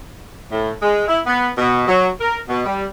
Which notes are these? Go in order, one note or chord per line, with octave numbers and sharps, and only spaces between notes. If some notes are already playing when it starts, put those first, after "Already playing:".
A2
G#3
E4
B3
B2
F#3
A#4
B2
G3